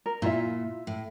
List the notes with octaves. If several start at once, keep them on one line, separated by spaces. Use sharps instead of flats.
A#4
A#2 E4 F4 E5
A2